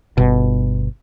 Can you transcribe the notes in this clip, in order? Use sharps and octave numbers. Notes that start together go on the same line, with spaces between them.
G1 B2